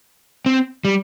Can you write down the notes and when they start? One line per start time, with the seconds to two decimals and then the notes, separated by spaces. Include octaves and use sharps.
0.46 C4
0.85 G3